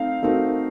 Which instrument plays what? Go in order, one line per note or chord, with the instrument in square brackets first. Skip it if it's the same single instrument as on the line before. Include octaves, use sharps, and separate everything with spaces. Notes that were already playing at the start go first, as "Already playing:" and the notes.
Already playing: [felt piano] A3 C4 D#4 [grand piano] F5
[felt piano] A3 C4 D#4 F#4 A#4